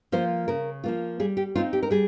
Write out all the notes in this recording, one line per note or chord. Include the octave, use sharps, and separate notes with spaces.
F3 A#3 F4 C5
C#3 A#4
F3 A#3 F4
G3 G#4
G4
C4 D#4 F4
G4
A#4
G3 G#4